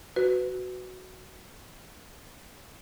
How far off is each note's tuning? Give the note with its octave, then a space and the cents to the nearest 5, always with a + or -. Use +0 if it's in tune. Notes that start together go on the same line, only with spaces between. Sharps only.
F#4 +0 B4 +20